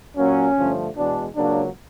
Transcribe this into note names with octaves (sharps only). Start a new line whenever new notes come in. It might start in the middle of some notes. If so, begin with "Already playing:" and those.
A#2 F#3 A#3 C#4
G2 D3 F3 A3
E2 B2 G#3 D4
C#2 C#3 F#3 A#3 D4